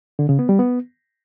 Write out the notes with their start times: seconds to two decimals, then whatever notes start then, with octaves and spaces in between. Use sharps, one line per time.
0.19 D3
0.29 C#3
0.39 B3
0.49 G3
0.59 B3